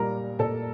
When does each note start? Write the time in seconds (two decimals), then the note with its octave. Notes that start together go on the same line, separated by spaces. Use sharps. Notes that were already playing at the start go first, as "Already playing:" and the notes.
Already playing: A#2 G3 A#3 A#4 A#5
0.39 A#2 A4 A5